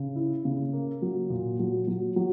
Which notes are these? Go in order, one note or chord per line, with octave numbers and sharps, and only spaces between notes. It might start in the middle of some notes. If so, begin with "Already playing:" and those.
Already playing: C#3
E4
C#3
A#3
F#3
A#2
F#3
F#3
F#3